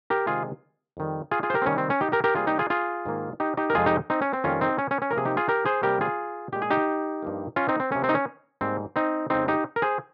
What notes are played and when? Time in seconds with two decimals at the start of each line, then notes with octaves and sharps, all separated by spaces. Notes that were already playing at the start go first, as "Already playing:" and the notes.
0.10 G4 A#4
0.27 C3 D#3 G#3 F4 G#4
0.97 F2 D#3 G3
1.31 F4 G#4
1.43 F4 G#4
1.50 C5
1.54 G4 A#4
1.62 C4
1.66 C3 D#3 G3 A#3 C#4
1.78 C4
1.90 C#4
2.01 D#4 G4
2.12 G4 A#4
2.24 G4 A#4
2.35 C3 G3 A#3 F4 G#4
2.47 D#4 G4
2.59 F4 G#4
2.70 F4 G#4
3.05 G#2 D#3 A#3
3.40 D#4 G4
3.57 D#4 G4
3.70 A#4
3.75 F2 C3 F3 G#3 F4 G#4
3.86 D#4 G4
4.10 C4 D#4
4.22 C#4
4.33 C4
4.44 F2 D#3 G3 A#3 C#4 F4
4.61 C4 D#4
4.78 C#4
4.91 C#4
5.02 C#4
5.11 A#4
5.13 C3 F3 A#3 G#4
5.25 D#4 G4
5.37 F4 G#4
5.48 G4 A#4
5.65 G#4 C5
5.83 C3 G3 A#3 G4 A#4
6.01 F4 G#4
6.52 A#2 G#3 G4
6.62 G#4
6.70 D#4 G4
7.22 G2 F3 A#3
7.56 C#4 F4
7.69 C4 D#4
7.80 C4
7.92 C3 F3 A#3 C#4
8.04 C4
8.09 D#4
8.15 C#4
8.61 G#2 G3 A#3 C4
8.96 C4 D#4
9.30 F2 C#3 F3 G#3 C4 D#4
9.48 D#4 G4
9.76 A#4
9.82 G#4 C5